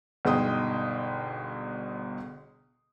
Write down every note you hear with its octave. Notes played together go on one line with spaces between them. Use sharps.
G1 B2 G#3 D#4 G5 D#6